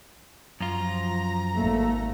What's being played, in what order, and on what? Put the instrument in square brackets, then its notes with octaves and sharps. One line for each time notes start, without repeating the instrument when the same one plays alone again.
[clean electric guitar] F#2 F4 [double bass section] F3 [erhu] A#5
[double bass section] G#1 A3 [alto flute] A#3